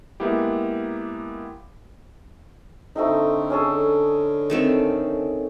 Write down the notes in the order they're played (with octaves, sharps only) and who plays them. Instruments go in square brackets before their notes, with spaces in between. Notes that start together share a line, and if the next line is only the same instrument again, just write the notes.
[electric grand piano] G#3 A#3 B3 E4 G4
[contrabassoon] D3 [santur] A3 C4 D#4
[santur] C#4 G#4 A4
[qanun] D#3 A3 C4